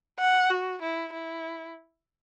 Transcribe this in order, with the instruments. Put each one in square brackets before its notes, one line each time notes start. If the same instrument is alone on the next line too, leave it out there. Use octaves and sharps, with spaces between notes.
[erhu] F#5
F#4
E4
E4